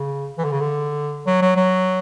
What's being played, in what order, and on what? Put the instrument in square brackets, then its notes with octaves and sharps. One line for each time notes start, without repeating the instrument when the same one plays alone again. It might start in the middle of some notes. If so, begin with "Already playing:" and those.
Already playing: [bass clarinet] C#3
E3
D3
C#3
D3
F#3
F#3
F#3